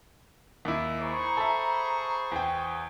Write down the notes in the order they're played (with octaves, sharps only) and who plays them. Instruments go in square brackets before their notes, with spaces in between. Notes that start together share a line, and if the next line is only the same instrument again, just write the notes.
[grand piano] D#2 E4
[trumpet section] G#4 C5 C#6 [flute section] A#5 B5
[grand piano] A4 E5
E2 G5